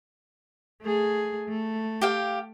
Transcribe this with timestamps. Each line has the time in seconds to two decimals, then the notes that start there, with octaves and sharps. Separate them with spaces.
0.82 A3 G#4
1.49 A3
2.01 G4 F5 G5